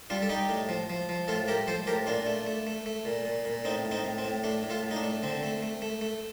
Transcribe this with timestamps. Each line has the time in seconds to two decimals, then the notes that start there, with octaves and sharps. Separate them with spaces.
0.10 G3 D4 F4
0.22 A4
0.29 G3 D#4 G4
0.49 A2
0.69 F3
0.90 F3
1.09 F3
1.28 A2 F4 A4
1.48 A3 G4 A#4
1.67 F3 A4 C5
1.87 A2 G4 A#4
2.07 A#2 D4 F4
2.26 A3
2.46 A3
2.67 A3
2.86 A3
3.05 A#2
3.25 A#2
3.45 A#2
3.65 A2 C4 D#4
3.85 A2
3.91 C4 D#4
4.04 A2
4.18 C4
4.24 A2
4.44 A3 D4
4.63 A2
4.70 F4 A4
4.83 A2
4.91 D#4
4.96 D4
5.03 A3
5.22 D3 C4
5.43 A3
5.63 A3
5.82 A3
6.01 A3